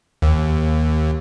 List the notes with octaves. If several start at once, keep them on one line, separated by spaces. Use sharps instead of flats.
D#2